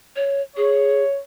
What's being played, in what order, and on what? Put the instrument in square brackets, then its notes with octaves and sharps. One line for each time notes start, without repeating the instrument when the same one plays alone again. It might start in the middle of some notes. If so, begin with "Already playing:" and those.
[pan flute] C#5
[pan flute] G#4 [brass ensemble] C#5